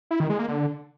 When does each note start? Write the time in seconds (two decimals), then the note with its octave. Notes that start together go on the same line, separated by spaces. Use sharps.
0.11 E4
0.20 D#3
0.30 G#3
0.39 A#3
0.49 D3